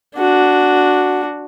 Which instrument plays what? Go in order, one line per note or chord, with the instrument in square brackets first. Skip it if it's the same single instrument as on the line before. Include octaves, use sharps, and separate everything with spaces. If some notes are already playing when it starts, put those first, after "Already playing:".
[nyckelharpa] D4 F#4